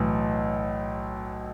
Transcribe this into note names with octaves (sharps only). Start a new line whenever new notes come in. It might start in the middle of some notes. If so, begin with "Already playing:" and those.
Already playing: B1 A2 E3